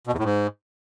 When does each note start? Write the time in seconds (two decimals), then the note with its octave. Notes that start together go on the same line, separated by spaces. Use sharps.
0.07 B2
0.13 E2
0.19 A2
0.24 G#2